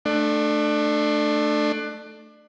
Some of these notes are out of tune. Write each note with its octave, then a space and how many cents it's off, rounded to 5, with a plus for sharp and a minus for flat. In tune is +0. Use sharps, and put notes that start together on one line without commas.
A3 +0 D4 +25